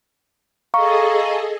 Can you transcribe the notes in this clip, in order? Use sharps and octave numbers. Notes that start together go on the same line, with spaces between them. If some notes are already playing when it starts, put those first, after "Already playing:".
G#4 A4 D#5 F5 A#5 C#6